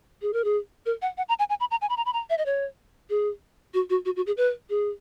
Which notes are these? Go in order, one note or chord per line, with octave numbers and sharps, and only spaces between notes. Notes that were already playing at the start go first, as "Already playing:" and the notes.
G#4
A#4
G#4
A#4
F#5
F#5
A#5
G#5
G#5
B5
A#5
G#5
B5
A#5
B5
A#5
E5
D#5
C#5
G#4
F#4
F#4
F#4
F#4
G#4
B4
G#4